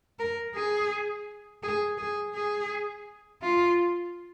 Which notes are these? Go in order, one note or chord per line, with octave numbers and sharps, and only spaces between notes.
A#4
G#4
G#4
G#4
G#4
F4